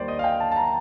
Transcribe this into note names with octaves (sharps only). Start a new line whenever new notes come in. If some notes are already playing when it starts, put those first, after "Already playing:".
Already playing: D#2 D#3 G3 C5 D5
D#5
F5
G5
A5
A5
A#5